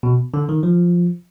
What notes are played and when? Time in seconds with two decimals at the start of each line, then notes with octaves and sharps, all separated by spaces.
0.03 B2
0.34 D3
0.49 D#3
0.63 F3